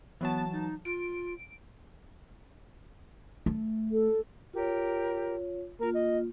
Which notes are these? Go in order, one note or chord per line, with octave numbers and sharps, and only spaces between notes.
E3 F#3 B3 A5
D#4
F4 D7
A3
A4
F4 G4 A#4 C#5
A#3 F4 A#4
D#5